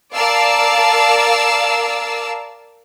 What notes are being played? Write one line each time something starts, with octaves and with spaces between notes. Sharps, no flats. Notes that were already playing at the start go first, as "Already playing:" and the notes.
A#4 D5 F5 A5 E6